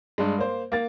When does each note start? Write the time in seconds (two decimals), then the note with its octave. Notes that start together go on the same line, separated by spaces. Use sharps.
0.18 G2 G3 G#3
0.38 A#3 C5
0.72 A#3 A6